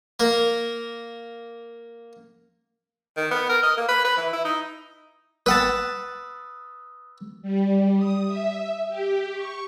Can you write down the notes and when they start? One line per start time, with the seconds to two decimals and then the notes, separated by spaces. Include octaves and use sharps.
0.20 A#3 A#4
3.17 D#3
3.31 B3
3.49 A#4
3.63 D#5
3.77 A#3
3.89 B4
4.05 B4
4.17 E3
4.33 E4
4.45 D#4
5.46 B4 F#5 A5 D#6 E6
7.42 G3
7.97 D#6
8.27 E5
8.89 G4
9.33 C#6